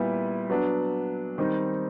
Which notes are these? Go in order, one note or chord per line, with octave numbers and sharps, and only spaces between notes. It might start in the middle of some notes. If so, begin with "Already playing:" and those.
Already playing: A#2 G3 B3 E4
F#3 B3 D4
D#3 G3 C4 D#4